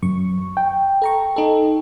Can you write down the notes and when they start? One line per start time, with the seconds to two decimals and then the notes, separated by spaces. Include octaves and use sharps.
0.03 F#2 C#6
0.57 G5
1.02 A4 A#5 C#6
1.36 D#4 A4